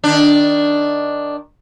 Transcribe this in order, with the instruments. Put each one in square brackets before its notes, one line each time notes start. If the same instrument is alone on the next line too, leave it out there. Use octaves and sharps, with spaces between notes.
[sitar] D#3 D4